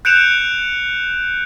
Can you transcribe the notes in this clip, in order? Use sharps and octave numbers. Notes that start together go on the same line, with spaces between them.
F#6 G6 C#7 D7 E7 F7